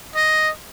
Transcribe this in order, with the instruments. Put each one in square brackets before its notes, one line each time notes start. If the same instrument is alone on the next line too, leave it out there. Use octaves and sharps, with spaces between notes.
[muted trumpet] D#5